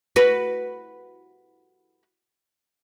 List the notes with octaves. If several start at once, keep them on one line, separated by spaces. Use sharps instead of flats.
F#4 B4